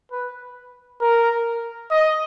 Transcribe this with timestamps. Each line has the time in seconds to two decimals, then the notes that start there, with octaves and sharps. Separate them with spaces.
0.12 B4
1.01 A#4
1.91 D#5